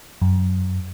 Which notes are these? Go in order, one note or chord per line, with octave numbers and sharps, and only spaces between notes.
F#2